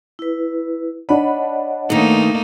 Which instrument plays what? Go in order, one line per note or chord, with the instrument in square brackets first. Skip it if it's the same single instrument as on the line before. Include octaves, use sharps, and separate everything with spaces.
[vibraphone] E4 B4
[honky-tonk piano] D4 B5 [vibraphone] C#5 D#5 F#5
[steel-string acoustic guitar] G2 D#3 [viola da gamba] A3 A#3 D#4